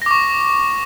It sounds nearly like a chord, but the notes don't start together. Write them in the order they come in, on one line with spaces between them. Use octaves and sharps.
A#6 D6 C#6